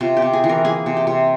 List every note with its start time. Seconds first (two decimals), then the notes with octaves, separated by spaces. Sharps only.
0.01 C3 F4
0.17 G4
0.22 C3
0.33 G#4
0.44 E3
0.49 A#4
0.65 A#3 G#4
0.86 C3
0.97 G4
1.07 C3